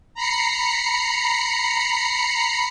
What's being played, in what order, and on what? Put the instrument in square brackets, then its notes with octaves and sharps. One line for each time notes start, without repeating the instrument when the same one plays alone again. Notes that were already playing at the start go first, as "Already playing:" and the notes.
[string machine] A#5 B5 C7 C#7